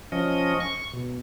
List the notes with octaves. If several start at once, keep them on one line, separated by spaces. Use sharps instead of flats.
F3 C#4 D#5
C#6
B2